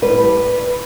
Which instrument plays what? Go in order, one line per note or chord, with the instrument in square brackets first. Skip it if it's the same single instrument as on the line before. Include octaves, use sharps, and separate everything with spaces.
[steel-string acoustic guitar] A2 G3 B4